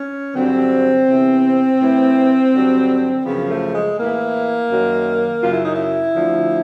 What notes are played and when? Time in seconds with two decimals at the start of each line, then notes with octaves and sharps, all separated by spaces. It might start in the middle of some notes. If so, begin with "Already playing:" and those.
Already playing: C#4
0.35 G2 D3 F#3 C4
1.08 E2 C3 E3
1.80 A2 E3
2.53 G2 D3 F#3
3.25 F#2 C#3 F3 B3
3.49 A3
3.73 G#3
3.97 A2 E3 A#3
4.70 F#2 D#3 F#3
5.42 F#2 C#3 F#3 F4
5.53 E4
5.64 D#4
5.74 E4
6.14 D2 D3 F3